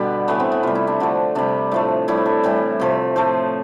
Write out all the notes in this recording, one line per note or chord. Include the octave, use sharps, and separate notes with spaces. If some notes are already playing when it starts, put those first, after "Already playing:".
Already playing: B2 D3 G3 B3
A2 E3 A3 B3
C4
B3
C3 G3 F4
E4
D4
D3 F3 A3
C3 G3 D4
A2 F3 A3
A2 G3 E4
A4
A2 E3 G3
C3 F3 A3
A2 F3 A3 C5